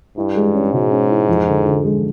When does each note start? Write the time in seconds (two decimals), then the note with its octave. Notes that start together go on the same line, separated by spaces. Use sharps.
0.17 G2 E4
0.36 G#3
0.55 C#4
0.73 G#2 B2
0.91 C#4
1.10 E4
1.28 F2
1.47 D3
1.66 D3
1.84 G#3